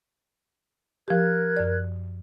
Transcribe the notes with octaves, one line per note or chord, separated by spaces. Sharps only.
F3 G4 A#4 F#6 G#6
F#2 D5